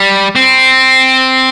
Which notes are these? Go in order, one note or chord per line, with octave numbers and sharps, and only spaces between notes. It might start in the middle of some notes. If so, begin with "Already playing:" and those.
Already playing: G3
C4